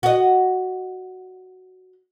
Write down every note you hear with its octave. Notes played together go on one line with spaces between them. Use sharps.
F#4 D#5